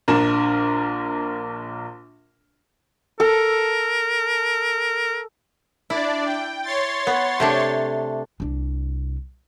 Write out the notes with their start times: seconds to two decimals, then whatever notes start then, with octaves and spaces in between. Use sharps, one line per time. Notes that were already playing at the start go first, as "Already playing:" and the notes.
0.08 A#1 D4 A#4 E7
3.20 A4 A#4
5.90 D4 E4 D5
6.25 G5
6.63 C#5 C6 A6
7.07 B3
7.40 C3 A3 D4
8.40 C2 D4